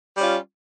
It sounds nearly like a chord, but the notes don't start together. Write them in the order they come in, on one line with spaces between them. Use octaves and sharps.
G3 C#4 F4